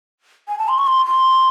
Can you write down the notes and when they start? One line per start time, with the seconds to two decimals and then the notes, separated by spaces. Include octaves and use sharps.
0.48 G#5
0.59 A5
0.68 C6
0.78 C#6
0.87 C6
1.06 C6